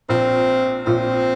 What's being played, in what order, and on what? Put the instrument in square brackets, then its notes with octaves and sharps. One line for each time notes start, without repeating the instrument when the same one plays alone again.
[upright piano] A#1 A#2 [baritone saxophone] C4
[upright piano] A#1 A#2 [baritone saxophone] C4